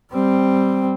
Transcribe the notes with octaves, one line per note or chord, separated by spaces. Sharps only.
G3 C4